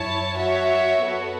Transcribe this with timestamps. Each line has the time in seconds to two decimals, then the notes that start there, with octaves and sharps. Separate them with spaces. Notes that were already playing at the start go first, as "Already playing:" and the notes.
Already playing: F#2 E4 C#5 A5
0.38 F#4 C#5 E5
1.05 B3 F#4 A4